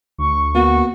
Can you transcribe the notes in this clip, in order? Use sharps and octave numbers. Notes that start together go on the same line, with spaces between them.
D2 C#6
A#3 B3 F#4